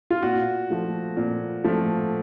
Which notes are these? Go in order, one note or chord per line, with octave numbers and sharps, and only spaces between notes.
F4
A#2 F#4
F3 A3
A#2
F3 A3